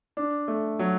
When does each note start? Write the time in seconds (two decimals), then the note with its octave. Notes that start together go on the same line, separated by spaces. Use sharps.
0.17 D4
0.48 A3
0.79 F#3